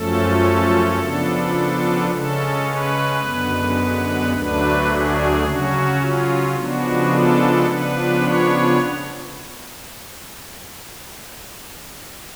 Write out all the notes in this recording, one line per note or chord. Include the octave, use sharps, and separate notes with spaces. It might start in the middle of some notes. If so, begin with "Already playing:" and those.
Already playing: F#2 F3 A3 C#4 A4
C#3 F3 B3 D4
C#3 G#3 C#4 A4
B4
F#2 D3 G#3 B3
D2 D3 F#3 A3 D4 B4
G#4
C#3 F#3 C#4 F#4
F4
C#3 F3 G#3 B3 D4 F#4
A4
C#3 F3 B3 D4 B4
C#5